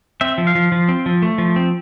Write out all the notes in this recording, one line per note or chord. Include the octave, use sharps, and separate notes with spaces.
C4 E5
F3
F5
F3
F3
C4
F3
A3
F3
C4